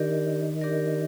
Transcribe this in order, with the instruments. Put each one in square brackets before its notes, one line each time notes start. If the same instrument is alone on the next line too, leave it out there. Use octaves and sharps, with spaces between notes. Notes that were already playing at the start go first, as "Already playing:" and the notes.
Already playing: [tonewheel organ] D#3 [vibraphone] D4 G4 A#4 D5
[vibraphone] D4 G4 A#4 D5